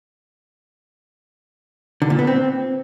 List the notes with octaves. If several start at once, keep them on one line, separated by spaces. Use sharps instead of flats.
D3
A#2
B3
C4